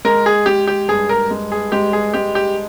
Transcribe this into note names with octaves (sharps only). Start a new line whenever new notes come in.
G#3 A#4
G#4
G#3 G4
G4
G2 G#4
A#4
G#3
G#4
G#3 G4
G#4
G#3 G4
G4